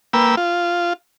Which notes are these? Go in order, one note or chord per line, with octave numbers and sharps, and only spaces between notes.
A#3 B4 G5 E6
F4